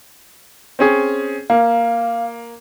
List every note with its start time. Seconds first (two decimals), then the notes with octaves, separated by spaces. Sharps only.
0.79 C4 C#4 G#4
1.50 A#3 F5